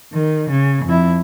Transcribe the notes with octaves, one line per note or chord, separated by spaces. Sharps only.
D#3
C#3
F2 E4